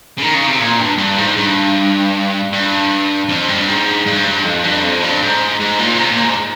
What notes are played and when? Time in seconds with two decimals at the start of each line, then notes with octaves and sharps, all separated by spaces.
0.18 C#3
0.22 D#3
0.34 C#3
0.47 C3
0.59 A#2
0.79 G2
0.98 G2
1.18 G#2
1.37 G2
2.52 G2
3.29 F2
3.48 G2
3.67 G#2
4.06 G2
4.16 G#2
4.24 G2
4.44 F2
4.63 G2
4.83 F2
5.02 G2
5.22 G#2
5.60 G#2
5.79 A#2
5.98 C3
6.11 A#2
6.24 G#2